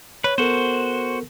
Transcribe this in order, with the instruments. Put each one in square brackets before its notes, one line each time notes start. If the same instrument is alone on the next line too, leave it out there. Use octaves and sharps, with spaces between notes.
[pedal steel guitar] B4 [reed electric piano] C#5
[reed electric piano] B3 A4 A#4 [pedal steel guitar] F#4 C5